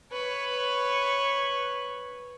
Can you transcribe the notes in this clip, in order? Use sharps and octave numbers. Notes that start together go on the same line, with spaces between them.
B4 C#5